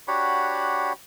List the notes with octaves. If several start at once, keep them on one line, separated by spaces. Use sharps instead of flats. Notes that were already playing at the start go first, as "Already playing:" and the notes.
D4 F#4 G4 C#5 F#5 B5